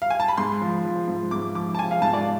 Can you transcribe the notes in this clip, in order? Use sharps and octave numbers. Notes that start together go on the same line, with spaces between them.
F5
G#5
A5
B5
G#2 C6
F3
F3
G#2
G#2 D6
F3 D6
A5
F3 G#5
F5
G#2 A5
D5